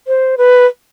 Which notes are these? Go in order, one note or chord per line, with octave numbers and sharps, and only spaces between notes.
C5
B4